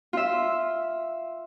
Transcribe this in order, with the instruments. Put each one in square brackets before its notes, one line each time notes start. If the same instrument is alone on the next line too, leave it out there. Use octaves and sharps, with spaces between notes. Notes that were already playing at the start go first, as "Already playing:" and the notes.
[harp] F4 E5